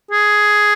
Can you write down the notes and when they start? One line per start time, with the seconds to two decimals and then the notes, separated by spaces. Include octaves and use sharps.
0.11 G#4